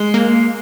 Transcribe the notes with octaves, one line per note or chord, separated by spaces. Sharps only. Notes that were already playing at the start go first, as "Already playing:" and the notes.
Already playing: G#3
A#3